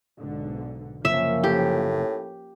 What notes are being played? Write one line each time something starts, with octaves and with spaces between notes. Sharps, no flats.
B1 G#2 D3
F#1 C3 F3 A#3 C#4 E5
A2 G4